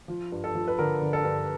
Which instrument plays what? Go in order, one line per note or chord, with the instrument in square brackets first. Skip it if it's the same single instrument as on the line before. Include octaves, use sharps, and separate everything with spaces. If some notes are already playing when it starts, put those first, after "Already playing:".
[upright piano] F3
G2
A4
F3
B4
D3 A#4
D3
A4
G2